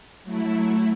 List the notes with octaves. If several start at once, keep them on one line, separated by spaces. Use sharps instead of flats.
F#3 A3 E4